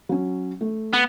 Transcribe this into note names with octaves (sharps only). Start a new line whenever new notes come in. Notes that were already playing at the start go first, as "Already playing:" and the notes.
F#3 C#4
A3
B3